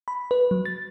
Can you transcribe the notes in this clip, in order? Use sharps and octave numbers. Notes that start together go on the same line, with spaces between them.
B5
B4
F#3
A6